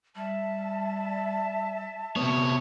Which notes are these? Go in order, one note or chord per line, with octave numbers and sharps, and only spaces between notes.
G3 E5 A5
C3 B3 C#5